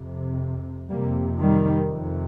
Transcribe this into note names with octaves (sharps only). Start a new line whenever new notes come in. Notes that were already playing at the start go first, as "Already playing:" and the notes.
Already playing: F2 C3
F2 C3 G3 A#3
D#3 G3
F2 C3